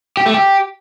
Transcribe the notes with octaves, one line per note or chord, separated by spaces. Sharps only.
G4
A3
G4